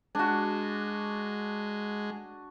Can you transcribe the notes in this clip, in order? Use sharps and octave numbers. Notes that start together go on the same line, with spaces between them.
G#3 D4 F#4